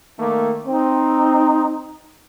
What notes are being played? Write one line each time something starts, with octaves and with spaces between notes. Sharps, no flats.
D#3 A3 A#3
C4 D#4